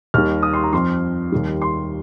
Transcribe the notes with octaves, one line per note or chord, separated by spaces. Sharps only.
D#2 D#3 G3 F6
D#6
C6
A#5
F2 F3 C6
D#2 D#3 G3
C6